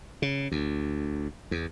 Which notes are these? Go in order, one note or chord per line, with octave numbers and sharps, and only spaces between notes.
C#3
D2
E2